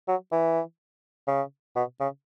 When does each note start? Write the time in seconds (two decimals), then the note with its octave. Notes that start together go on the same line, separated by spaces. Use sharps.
0.08 F#3
0.32 E3
1.27 C#3
1.76 B2
2.00 C#3